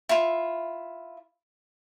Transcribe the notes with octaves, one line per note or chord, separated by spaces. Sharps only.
E4 F4